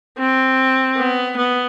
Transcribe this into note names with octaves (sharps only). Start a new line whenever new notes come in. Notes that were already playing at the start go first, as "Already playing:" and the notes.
C4
B3
B3